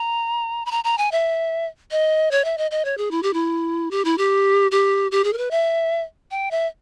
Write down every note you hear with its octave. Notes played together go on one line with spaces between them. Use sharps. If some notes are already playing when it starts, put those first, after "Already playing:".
Already playing: A#5
B5
A#5
A#5
G#5
E5
D#5
C#5
E5
D#5
D#5
C#5
G#4
E4
G4
E4
G4
E4
G4
G4
G4
G#4
A#4
B4
E5
G5
E5